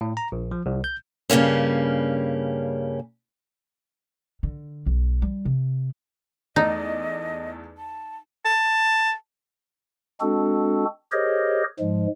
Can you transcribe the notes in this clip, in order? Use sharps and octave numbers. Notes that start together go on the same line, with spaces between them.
A2
A#5
A#1
F3
C2
G6
G2 C#3 G3 A#3 C#4
D3
B1
G3
C3
E2 A3 D#4 D5 D#5
A5
A5
G#3 C4 D4 F#4 A4
G4 G#4 A#4 C5 C#5 D#5
G#2 F3 G#3